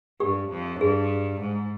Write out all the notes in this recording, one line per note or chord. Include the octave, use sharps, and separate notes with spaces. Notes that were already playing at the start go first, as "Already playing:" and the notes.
G2 G4
F2
G2 G#4
G#2